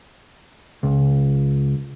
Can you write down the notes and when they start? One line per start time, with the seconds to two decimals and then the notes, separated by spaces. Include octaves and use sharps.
0.83 C#2